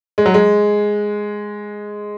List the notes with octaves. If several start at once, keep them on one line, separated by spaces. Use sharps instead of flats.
G#3
F#3
G#3